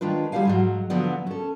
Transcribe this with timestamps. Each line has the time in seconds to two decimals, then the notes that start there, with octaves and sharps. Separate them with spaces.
0.01 D#3 G#3 D4 F4 B4
0.32 D2 G3 G#3 E4 F5 G#5
0.45 G#2 F3 F#3
0.90 D3 F3 F#3 B3 D5
1.27 C#4 A4